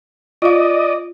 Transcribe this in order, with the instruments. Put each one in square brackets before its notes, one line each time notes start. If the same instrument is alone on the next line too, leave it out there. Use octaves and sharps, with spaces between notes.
[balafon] F4 F5 [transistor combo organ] D5 D#5